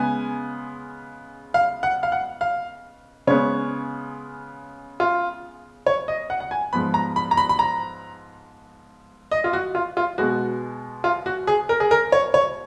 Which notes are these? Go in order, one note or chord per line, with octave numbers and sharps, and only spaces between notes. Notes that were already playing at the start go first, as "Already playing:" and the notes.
Already playing: C#3 G#3 B3 G#5
F5
F#5
F5
F#5
F5
C#3 G#3 B3 C#5
F4
C#5
D#5
F#5
F#5
G#5
G#2 F3 B3 B5
A#5
B5
A#5
B5
B5
A#5
D#5
F4
F#4
F4
F4
B2 G#3 B3 F#4
F4
F#4
G#4
A#4
G#4
A#4
C#5
C#5